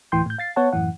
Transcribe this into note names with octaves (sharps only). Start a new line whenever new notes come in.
D2 A2 E3 G5 C6 G6
A2 G6
F5 A6 C7
B3 C#5 F#5 A5
F#2 A2 E3 F#5